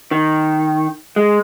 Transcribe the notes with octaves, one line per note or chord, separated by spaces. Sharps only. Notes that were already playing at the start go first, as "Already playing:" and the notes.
D#3
G#3